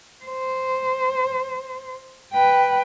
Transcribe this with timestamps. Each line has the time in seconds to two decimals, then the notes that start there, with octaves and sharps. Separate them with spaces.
0.25 C5
2.32 B4 G5